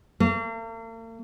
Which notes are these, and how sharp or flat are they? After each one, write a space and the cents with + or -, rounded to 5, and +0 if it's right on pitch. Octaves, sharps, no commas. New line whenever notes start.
A#3 -45